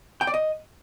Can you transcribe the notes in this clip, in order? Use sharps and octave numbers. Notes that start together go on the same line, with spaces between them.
G5
D5
D#5